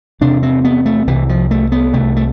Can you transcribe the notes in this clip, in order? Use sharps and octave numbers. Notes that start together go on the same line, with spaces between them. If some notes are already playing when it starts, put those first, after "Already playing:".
E2 C3 D4
C4
B3
A3
C2 C3 E3
F3
A3
B3
C2 C3 A3
A3